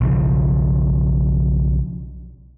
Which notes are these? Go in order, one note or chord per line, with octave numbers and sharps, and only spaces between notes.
B1 C#3 F3